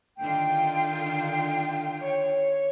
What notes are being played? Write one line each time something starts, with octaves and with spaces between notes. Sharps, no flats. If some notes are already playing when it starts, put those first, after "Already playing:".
D3 D#3 F4 G5
C#5